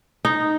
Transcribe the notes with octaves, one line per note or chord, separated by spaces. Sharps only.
D#4